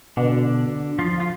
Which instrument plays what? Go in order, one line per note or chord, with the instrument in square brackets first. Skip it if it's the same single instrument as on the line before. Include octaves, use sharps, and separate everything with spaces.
[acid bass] B2 [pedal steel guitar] D3 D4
[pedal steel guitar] F3 F4
F4